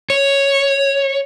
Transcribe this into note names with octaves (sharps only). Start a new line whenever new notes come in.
C#5